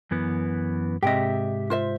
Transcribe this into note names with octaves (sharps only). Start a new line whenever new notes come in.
F#2 E3 B3
G#2 C3 G4 D#5 E5 G5
F4 C5 E5